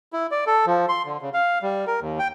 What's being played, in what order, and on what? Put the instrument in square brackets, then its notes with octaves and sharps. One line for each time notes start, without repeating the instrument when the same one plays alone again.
[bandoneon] E4
D5
A4
F3
C6
D3
C#3
F5
G3
A#4
D#2
G5